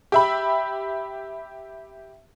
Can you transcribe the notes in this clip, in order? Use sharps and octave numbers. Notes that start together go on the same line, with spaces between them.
G4 E5 B5